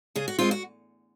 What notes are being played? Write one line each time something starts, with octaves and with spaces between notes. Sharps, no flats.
C#3 G#4
F#4
G#3 C4 F4
F#4